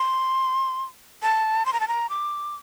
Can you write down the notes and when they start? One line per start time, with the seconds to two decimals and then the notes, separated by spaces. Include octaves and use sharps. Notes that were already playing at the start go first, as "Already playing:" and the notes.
Already playing: C6
1.22 A5
1.66 C6
1.73 A#5
1.80 A5
1.88 A#5
2.10 D6